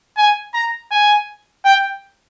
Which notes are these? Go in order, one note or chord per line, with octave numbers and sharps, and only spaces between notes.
G#5
A#5
G#5
G5